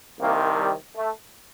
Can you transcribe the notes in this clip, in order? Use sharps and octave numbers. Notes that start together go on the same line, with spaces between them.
C2 C3 D#3 A#3
G3
A3